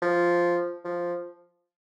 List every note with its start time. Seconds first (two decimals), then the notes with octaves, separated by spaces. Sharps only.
0.02 F3
0.85 F3